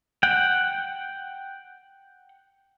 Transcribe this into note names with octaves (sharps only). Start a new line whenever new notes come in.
F#5 G5